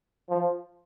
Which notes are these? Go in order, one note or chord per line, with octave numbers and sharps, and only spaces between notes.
F3